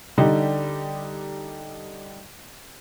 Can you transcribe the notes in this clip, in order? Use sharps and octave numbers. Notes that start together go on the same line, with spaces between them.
D3 G3 D#4 G4